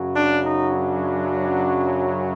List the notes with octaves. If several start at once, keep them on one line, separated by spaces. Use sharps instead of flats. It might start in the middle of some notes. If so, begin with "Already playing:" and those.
Already playing: F#2 C#3 F#3
D4
D#4
D4